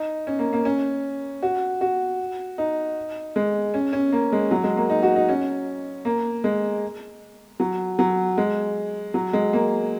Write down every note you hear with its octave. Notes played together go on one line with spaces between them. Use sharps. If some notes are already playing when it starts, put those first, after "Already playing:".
Already playing: D#4
C#4
A#3
A#3
C#4
F#4
F#4
D#4
G#3
C#4
C#4
A#3
G#3
F#3
G#3
A#3
D#4
F#4
D#4
C#4
A#3
G#3
F#3
F#3
G#3
F#3
G#3
A#3